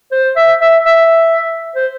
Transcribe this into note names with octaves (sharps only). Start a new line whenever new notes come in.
C5
E5
E5
E5
C5